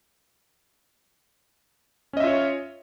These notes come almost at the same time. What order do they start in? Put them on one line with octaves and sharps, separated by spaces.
C#4 D#5 E5 F4 C#5